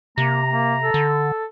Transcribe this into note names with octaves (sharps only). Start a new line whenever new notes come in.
C3 A#3 A#5
A#3
A4
D3